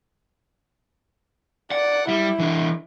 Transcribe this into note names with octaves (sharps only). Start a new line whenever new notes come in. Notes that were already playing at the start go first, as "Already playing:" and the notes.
D5 F#5
G3 E4
E3 D4